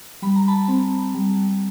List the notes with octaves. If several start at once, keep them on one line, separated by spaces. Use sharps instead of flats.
G3 B5
A#5
A5 B5
C4
G3